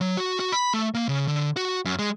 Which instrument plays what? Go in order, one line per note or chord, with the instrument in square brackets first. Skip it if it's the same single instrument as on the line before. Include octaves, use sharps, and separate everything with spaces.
[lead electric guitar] F#3
F#4
F#4
B5
A3
A#3
C#3
D3
F#4
F#2
G#3